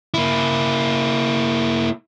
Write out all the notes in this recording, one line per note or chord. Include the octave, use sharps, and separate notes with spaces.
A#3 E4